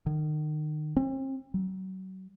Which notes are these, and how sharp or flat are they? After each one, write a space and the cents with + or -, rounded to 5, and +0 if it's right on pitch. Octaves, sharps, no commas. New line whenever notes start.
D#3 -35
C4 +40
F#3 +30